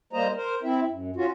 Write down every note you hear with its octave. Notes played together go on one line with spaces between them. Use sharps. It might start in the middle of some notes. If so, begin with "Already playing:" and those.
G3 A#3 C5 D#5 A#5
A#4 C5
C4 E4 E5
F#2
C#4 F4 F#4